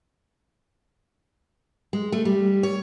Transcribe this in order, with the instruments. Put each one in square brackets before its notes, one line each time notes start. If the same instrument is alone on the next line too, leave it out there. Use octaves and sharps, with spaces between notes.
[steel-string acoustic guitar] G#3
A3
G3
C#5